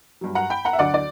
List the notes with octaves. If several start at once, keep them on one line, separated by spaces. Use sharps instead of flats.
G2 F#3
F#5 A#5
G5 B5
F#5 A#5
E5
D2 D3 F#3 D5 F#5
D5